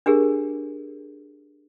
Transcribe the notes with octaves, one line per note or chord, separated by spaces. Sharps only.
D4 G4 G#4 A#4